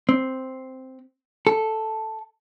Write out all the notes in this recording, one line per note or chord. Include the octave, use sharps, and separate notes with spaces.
C4
A4